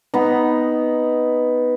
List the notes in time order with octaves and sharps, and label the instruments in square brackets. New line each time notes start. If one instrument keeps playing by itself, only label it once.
[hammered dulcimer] B3 D#4